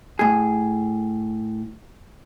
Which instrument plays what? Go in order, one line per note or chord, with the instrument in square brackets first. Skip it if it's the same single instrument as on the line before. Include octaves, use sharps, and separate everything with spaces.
[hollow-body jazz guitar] A2 G#4